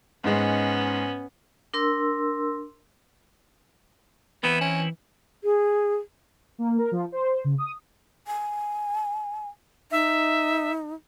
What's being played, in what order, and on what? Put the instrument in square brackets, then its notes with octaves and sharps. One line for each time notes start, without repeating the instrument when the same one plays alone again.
[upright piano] G#2 G#3 [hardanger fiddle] B3 C#4
[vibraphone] D4 A#4 C6 E6
[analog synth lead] E3 [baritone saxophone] B3 [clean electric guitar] C4 D#4 E4
[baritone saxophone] C#4
[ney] G#4
[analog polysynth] A#3
A#4
F3
C5
C#3
D#6
[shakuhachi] G#5
[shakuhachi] D#4 [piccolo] E5